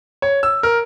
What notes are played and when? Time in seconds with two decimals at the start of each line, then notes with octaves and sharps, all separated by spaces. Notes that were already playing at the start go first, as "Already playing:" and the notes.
0.22 C#5
0.43 E6
0.63 A#4